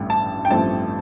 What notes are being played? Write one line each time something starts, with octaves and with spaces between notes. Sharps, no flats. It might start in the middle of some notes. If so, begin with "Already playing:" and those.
Already playing: A1 G2 D3 A3
A5
G5
A1 G2 F3 A3 C4 A5